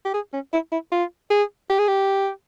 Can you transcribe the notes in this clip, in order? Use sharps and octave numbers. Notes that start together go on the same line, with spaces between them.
G4
G#4
C#4
E4
E4
F4
G#4
G4
G#4
G4